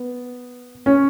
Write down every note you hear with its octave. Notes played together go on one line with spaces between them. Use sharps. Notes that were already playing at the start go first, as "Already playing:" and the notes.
Already playing: B3
C#4